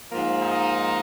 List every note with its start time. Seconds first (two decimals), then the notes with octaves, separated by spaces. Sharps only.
0.12 G#2 F3 A#3
0.42 D#4